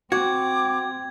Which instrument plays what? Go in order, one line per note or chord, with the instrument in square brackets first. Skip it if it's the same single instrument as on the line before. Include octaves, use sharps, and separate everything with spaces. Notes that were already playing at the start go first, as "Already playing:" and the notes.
[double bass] C4 [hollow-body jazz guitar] F#4 [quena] D6 [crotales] G#6